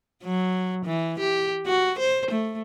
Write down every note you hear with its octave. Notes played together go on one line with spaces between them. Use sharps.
F#3
E3
G4
F#4
C5
A3